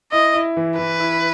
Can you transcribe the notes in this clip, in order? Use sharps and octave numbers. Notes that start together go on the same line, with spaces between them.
E4 D#5
E4
E3
E3 B4
E4